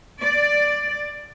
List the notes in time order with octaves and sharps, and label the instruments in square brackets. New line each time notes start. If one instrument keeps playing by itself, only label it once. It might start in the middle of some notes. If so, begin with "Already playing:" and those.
[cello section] D5